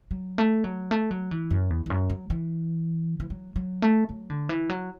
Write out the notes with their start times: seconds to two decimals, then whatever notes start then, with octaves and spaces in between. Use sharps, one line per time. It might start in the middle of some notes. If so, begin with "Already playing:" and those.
0.11 F#3
0.38 A3
0.64 F#3
0.91 A3
1.11 F#3
1.31 E3
1.50 F#2
1.70 E2
1.86 E2
1.90 F#2
2.10 F#3
2.30 E3
3.20 E3
3.30 F#3
3.56 F#3
3.82 A3
4.09 F#3
4.30 D3
4.49 E3
4.69 F#3